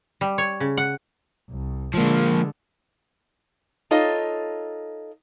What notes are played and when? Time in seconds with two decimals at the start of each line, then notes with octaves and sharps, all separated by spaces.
0.21 G3
0.38 C#5
0.60 C#3
0.77 F#5
1.50 C2
1.94 D3 F3 G#3 A#3
3.91 D#4 F4 A4 C#5 D#5